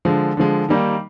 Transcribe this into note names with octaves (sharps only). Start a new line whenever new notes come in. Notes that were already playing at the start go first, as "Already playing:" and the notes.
D3 F3 G#3
D3 F3 G#3
D#3 G3 A#3 D#4